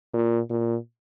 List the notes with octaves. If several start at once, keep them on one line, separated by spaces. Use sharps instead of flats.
A#2
A#2